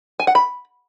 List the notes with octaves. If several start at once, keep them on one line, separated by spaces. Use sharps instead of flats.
G#5
F#5
B5